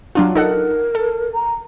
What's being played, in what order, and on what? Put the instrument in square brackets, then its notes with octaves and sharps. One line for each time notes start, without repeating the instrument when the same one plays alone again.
[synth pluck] F#3 D4 F4
[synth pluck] D#4 A4 F#5 [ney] A#4
[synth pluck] A4
[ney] A#5